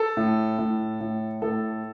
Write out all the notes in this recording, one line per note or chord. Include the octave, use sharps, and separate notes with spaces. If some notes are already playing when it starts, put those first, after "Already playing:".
Already playing: A4
A2
A2
A2
A2 A4